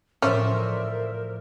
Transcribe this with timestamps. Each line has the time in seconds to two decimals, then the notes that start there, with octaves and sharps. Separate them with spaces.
0.22 A2 F3 C#4 A#4 C5 D5 E5